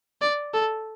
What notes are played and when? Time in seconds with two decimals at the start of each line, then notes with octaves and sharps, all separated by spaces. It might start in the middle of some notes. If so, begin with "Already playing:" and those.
0.22 D5
0.54 A4